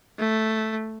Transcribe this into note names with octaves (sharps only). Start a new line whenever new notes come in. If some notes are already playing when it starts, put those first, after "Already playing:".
A3